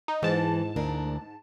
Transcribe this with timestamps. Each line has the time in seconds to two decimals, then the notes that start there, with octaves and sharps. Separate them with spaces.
0.08 D#4
0.23 G#2 E3 A5
0.76 D2 D4 A#4